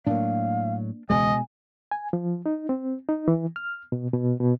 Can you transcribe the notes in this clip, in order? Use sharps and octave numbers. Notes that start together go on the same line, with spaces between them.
A2 F#3 A#3 D4 F5
E1 C#2 B2 G#3 D#5 G#5
G#5
F3
D#4
C4
D#4
E3
F6
B2
B2
B2